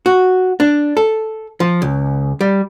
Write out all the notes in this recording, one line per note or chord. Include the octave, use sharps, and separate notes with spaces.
F#4
D4
A4
F3
C#2
G3